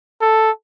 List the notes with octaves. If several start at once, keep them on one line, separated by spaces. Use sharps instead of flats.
A4